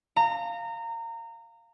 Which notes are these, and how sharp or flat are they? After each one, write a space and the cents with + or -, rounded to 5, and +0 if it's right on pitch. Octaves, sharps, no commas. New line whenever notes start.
F5 +0 A#5 -25